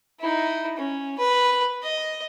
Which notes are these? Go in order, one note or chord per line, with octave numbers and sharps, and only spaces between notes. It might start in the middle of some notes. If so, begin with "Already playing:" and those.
D#4 E4
C#4
B4
D#5